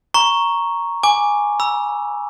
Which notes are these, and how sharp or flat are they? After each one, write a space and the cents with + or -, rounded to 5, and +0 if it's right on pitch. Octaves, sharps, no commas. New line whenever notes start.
A#5 +0 C#6 +0
G#5 +0 D6 +0
B5 -40 E6 +0